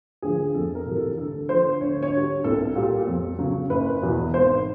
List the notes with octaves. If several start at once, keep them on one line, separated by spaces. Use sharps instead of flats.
D2 D3 F3 G#4
F2 A4
A#4
C3 E3 G3
A4
D2 A4
D3 F3 C5
D2 C#5
C#5
D3 G3
C2 A4
A#2 G3
F2
C#3 F#3
F#1 B4
E2 B2
G#1 C5